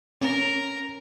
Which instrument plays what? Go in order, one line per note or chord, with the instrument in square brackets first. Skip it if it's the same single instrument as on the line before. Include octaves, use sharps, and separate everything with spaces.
[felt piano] C#4 [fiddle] A#4